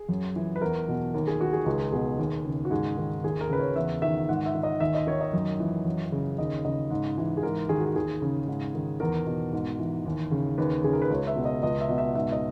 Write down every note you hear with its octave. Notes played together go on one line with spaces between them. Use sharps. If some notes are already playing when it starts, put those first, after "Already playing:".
Already playing: G#4
F#2
E3
B4
E2 A#4
B2
D#2 A#4
G#4
D#3 F#4
G#4
C#2 G#4
B2 G#4
D#2
C#3
F#4
G#2 G#4
D#3
D#2 G#4
A#4
C#3 B4
C#5
E2 E5
D#3 E5
G#2 F#5
E5
D#3
D#5
D#2 E5
D#5
D#3 C#5
D#5
F#2
E3
F#2
C#3
D#2 D#5
C#3 D#5
G#2
E3
G#4
G#2 A#4
D#3 G#4
F#4
G#4
D#2 G#4
C#3
G#2
D#3
E2 A#4
B2
G#2
E3
D#2
C#3
D#2 B4
C#3 G#4
A#4
B4
C#2 C#5
E5
B2
D#5
C#2 D#5
E5
B2
E5
G#2 E5
D#5